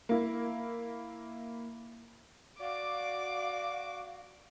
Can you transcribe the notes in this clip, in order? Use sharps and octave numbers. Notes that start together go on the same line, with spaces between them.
A#3 E4
F#4 D5 F5 D6